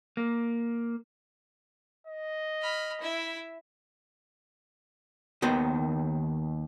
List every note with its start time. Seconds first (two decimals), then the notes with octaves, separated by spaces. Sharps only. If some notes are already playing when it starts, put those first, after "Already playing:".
0.17 A#3
2.07 D#5
2.61 B5 F6
3.00 E4 E5
5.42 D#2 D#3 B3 C5